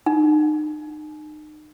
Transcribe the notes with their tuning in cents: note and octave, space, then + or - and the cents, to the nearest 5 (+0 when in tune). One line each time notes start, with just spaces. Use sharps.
D#4 -35